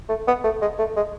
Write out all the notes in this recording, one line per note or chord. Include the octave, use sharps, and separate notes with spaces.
A3
B3
A3
G#3
A3
G#3